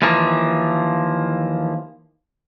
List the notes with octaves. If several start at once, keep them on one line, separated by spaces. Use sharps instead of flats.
D#2 E3 F3 A#3